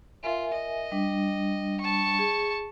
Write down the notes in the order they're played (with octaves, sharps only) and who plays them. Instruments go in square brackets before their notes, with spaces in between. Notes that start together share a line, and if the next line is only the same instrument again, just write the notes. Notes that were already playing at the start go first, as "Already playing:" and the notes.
[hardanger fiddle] F4 [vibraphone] A#4 E5 G#5
[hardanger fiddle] D#5
[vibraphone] G3 D4
[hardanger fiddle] A5 C#6
[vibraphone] G#4